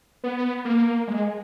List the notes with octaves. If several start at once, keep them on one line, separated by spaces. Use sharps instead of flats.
B3
A#3
G#3